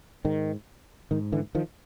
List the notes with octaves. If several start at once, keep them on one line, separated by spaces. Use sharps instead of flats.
G#2 D#3
G#2 D#3
D3 E3
D#3 F3